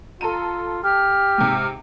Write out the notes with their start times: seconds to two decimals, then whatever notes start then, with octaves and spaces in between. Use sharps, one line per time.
0.21 F4 A4 A#5 D#7
0.84 G4 F6
1.38 G#2 C3